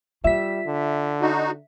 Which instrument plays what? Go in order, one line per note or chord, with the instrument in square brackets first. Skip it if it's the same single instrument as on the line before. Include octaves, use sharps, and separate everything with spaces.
[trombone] G3 [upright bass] F4 [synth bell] E5 B6
[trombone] D3
[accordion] D#4 F#4